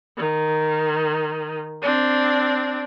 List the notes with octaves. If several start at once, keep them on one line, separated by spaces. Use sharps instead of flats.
D#3
C4 D4